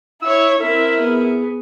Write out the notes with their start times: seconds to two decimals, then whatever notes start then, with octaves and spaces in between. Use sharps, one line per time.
0.22 E4 C#5 E6
0.60 C4 E4 A#4 E5
1.00 B3 G#4